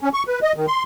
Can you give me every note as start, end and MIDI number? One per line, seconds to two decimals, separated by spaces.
0.01 0.09 61
0.13 0.23 85
0.27 0.39 71
0.42 0.53 75
0.56 0.66 51
0.68 0.83 84